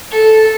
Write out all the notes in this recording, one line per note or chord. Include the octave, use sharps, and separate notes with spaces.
A4